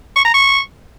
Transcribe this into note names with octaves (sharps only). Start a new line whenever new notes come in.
C#6
A#5
C#6